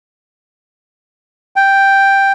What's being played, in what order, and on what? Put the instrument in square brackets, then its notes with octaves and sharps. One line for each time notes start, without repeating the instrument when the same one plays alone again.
[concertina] G5